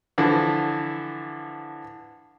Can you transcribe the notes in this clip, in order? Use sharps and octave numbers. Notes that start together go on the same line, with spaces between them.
D3 E3 F3